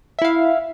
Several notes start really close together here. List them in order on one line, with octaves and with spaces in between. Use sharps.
E5 E4 F5